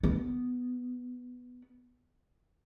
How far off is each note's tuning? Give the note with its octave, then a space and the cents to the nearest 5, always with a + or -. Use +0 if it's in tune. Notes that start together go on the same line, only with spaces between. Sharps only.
B3 +5